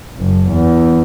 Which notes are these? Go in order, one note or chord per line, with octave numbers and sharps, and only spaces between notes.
F#1
E2